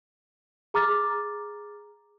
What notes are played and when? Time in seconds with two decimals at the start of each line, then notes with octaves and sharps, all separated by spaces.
0.74 G#4 A#5 D6 F6 A6